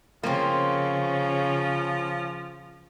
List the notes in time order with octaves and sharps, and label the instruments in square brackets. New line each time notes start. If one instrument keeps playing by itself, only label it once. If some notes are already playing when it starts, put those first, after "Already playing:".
[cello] C#3 [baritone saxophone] F3 [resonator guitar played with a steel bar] A#3 C4